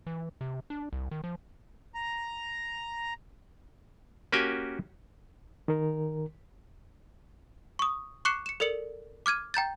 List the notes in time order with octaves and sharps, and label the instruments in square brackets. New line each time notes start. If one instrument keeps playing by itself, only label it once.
[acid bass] E3
C3
D4
C2
D#3
F3
[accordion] A#5
[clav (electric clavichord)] A#3 C#4 F#4 G4 G5 G#5
[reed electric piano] D#3 A#4
[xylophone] C#6 D#6
C#6 D6 F#6 C7 C#7 E7
C#7 E7
A4 A#4 D5 C#7 F#7
D6 F6 G#6 D#7
G5 A#5 G6 A6